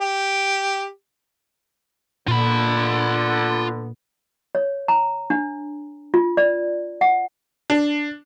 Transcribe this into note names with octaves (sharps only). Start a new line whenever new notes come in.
G4
A#2 D3 B3 F4 B5
C#5
A#5
D4
F4
D5
F#5
D4